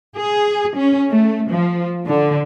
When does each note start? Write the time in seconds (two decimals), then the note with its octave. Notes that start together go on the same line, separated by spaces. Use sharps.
0.16 G#4
0.76 C#4
1.09 A3
1.50 F3
2.06 D3